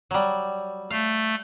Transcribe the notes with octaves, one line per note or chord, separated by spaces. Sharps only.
F#3 G3
A3 F5